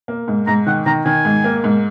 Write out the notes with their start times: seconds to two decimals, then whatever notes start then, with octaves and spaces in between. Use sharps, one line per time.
0.08 A#3
0.28 G#2
0.47 G#2 A#5
0.66 D#3 F#5
0.86 D#3 A#5
1.05 D#3 G#5
1.25 G#2
1.44 A#3
1.64 G#2